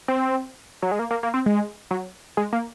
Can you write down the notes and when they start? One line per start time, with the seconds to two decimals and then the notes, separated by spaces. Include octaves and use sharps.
0.08 C4
0.82 F#3
0.91 G#3
0.99 A#3
1.11 A#3
1.23 A#3
1.34 C4
1.46 G#3
1.91 F#3
2.37 G#3
2.53 A#3